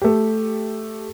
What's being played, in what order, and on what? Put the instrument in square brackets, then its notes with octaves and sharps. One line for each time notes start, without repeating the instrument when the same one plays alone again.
[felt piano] A3 G4